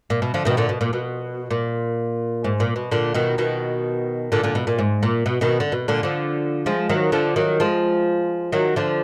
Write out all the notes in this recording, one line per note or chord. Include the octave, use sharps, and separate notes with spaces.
A#2
B2
D3 F3
B2 D#3
A#2 D3
B2
A#2
B2
A#2
G#2
A#2
B2
A#2 D3
B2 D#3
B2 D#3
A#2 D3
A#2 D3
B2
A#2
G#2
A#2
B2
B2 D#3
D3
B2
A#2 D3
D3 F3
F3 G#3
D#3 F#3
D3 F3
D#3 F#3
F3 G#3
D#3 F#3
D3 F3